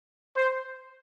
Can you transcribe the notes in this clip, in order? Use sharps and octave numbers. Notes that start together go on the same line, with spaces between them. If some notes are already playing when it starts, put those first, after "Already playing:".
C5